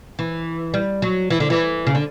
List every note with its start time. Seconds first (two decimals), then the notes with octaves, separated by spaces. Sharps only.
0.19 E3
0.74 G3
1.02 F#3
1.30 E3
1.40 D3
1.50 E3
1.87 C#3
1.95 D3